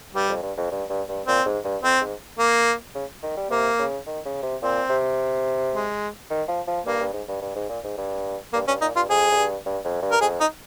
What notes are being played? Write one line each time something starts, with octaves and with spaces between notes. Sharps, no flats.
G2 G3
F2
G2
F2
G2
G2
G2
A#2 C4
G#2
G2
F2 C4
G#2
A#3
C#3
D#3
G3
C3 A#3
C#3
D#3
C#3
C3
A#2 C4
C3
G#3
D#3
F3
F3
G2 A#3
G2
G#2
G2
G2
G#2
A#2
G#2
G2
G2 A#3
G2 C#4
A#2 D#4
G2 F4
F2 G#4
F2
G2
G2
F2
G2
A#4
F2 G#4
D#4